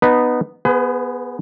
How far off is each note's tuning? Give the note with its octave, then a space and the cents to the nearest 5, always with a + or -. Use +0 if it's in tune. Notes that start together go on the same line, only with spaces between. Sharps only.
B3 +0 D#4 -20 B4 +0
B3 -15 G#4 +0 B4 +40